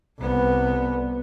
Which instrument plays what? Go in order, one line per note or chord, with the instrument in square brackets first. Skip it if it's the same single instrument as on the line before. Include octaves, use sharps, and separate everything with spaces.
[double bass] C2 B3